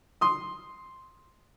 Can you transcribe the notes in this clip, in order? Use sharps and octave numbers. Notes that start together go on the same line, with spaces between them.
C6 D#6